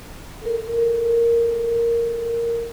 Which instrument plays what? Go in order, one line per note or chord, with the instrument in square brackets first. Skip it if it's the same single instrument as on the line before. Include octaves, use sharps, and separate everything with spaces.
[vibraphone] A4 A#4